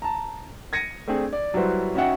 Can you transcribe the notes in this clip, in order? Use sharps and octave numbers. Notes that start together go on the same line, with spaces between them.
A5 A#5
G#6 A#6 C#7 D#7
A3 C4 D4 G#4
D5
F#3 G3 E4 F#4 B4 C5
C#4 D#4 F#4 E5 F#5 G5